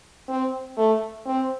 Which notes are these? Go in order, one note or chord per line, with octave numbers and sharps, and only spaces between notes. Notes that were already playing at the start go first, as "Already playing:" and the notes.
C4
A3
C4